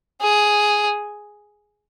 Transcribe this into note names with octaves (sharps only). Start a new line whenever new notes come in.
G#4